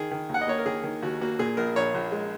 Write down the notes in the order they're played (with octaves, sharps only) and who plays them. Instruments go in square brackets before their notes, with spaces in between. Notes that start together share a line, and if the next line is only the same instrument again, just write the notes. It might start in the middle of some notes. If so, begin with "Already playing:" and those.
Already playing: [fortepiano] D#3 G#4
D#3
D#2 F#5
D#5
A#3 C#5
A#4
D#3 G#4
D#3
D#2 F#4
A#3 F#4
A#2 G#4
A#1 A#4
A#1 C#5
A#1
G#3